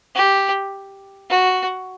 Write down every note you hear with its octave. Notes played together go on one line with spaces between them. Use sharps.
G4
F#4